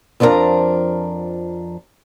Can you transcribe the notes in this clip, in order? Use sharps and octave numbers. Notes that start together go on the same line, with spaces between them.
F2 F3 D4 E4 A#4 A#5